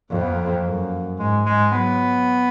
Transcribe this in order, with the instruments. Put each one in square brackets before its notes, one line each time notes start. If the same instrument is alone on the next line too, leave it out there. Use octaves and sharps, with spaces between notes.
[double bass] F2 [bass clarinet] A#3
[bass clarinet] B3
A#3
[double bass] F#2
[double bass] G#2 [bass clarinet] G#3
[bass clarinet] G#3
[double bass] F#3 [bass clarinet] B3